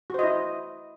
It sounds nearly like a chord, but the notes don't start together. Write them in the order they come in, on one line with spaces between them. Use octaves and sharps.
F#4 C5 D#5 E4